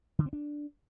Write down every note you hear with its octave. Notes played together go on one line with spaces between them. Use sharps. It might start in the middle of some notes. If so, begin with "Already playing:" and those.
D3
C4
D4